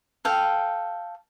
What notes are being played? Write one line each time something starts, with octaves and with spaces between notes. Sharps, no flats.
A4 F5 G5